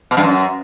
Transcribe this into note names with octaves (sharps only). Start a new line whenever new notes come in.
B2
G2
F#2